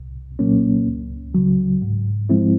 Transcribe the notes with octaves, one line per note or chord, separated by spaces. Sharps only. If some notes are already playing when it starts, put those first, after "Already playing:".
Already playing: C2
A#2 F#3 A#3 C#4
C#2
C#3 F#3
G#2
F3 G#3 C4 E4